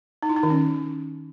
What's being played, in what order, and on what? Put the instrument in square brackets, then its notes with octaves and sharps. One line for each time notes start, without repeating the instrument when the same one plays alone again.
[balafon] D#4
E4
D#4
D#3
C#4